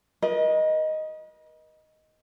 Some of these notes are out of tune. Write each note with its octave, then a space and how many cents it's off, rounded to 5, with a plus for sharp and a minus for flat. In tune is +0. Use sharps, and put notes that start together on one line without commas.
B4 -45 D#5 +0